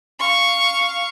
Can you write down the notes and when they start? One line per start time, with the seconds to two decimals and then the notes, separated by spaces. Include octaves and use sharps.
0.19 F5 C#6